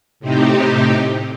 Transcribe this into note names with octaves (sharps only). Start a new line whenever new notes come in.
A2 C3 C4 D#4 G4